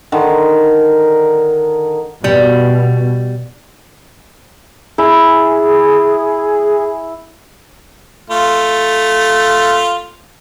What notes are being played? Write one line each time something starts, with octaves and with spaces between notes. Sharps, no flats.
D3 D#3
B2 G3
E4 G#4
A3 F4